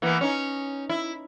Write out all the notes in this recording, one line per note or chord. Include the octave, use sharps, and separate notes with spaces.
E3 A#3 B3
C#4 D#4
E4